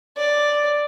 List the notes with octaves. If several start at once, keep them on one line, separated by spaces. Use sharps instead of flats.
D5